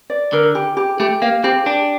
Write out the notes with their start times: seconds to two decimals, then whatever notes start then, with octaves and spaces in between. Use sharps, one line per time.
0.10 D5
0.33 D3 A#4
0.55 G4
0.77 G4
1.00 A3 G4
1.22 A#3 F5
1.44 C4 G4
1.66 D4 G4